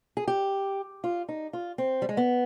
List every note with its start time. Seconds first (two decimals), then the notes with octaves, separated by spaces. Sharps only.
0.17 G#4
0.27 G4
1.04 F4
1.29 D#4
1.53 F4
1.78 C4
2.02 G3
2.09 G#3
2.17 B3